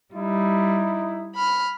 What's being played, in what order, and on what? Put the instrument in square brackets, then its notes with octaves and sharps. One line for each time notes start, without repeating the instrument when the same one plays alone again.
[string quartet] G3 [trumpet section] D#4 E4
[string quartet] B5 F6